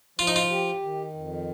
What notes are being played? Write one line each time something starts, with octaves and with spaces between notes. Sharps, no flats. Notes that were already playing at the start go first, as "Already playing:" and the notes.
F3 F4
D#4
F4
G4
D#3
F2